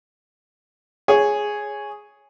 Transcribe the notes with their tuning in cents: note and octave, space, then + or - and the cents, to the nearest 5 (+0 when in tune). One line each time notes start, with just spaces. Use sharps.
G#4 +0 C#5 +0